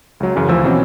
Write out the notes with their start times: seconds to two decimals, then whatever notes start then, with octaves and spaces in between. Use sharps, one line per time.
0.20 C#2 F#3
0.36 F#2 C#3 E3 C#4
0.48 D2 E3 F3 G#5 E6
0.64 B2 E3 F#3 C4 C#4